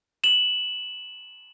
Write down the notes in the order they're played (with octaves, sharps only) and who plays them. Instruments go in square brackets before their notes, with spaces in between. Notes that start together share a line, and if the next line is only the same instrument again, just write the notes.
[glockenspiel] E7 F#7